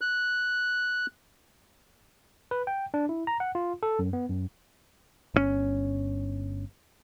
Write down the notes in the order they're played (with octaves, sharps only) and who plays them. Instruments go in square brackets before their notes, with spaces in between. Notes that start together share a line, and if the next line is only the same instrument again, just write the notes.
[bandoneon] F#6
[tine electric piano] B4
G5
D4
E4
A#5
F#5
F4
A4
F#2
B3
F#2
[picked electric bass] G1 D3 C#4